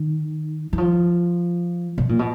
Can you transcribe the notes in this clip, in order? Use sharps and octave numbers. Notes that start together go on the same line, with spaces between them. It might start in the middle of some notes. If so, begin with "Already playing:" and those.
Already playing: D#3
E3
F3
B2
A#2
B2